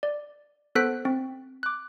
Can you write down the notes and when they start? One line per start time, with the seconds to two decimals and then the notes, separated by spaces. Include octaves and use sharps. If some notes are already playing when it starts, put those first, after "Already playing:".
0.03 D5
0.75 B3 A4 C5 F#6 B6 D7
1.05 C4
1.63 D6 F#6